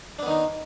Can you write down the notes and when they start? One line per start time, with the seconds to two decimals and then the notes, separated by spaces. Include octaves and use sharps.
0.19 D4
0.23 B3
0.26 D#3
0.30 D#4